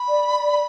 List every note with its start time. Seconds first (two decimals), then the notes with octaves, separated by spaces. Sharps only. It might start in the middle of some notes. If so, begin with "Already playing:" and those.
Already playing: B5
0.08 D5